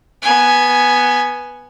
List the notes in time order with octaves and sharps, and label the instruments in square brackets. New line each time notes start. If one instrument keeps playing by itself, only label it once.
[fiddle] B3 G#5